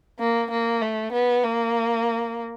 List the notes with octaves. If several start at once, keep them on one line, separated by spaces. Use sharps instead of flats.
A#3
A#3
A3
B3
A#3